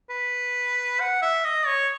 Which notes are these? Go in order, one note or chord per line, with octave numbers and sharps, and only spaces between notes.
B4
F#5
E5
D#5
C#5